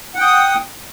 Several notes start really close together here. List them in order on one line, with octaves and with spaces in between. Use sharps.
F#5 G5 D#6